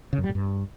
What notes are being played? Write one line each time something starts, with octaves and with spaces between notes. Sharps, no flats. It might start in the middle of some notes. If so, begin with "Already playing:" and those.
C#3
F#2
G3
A2
G2